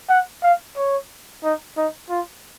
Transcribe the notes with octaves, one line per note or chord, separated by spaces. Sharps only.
F#5
F5
C#5
D#4
D#4
F4